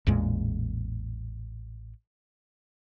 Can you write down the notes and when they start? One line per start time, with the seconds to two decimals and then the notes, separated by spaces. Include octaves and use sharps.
0.07 A1 E2 A#2 G#3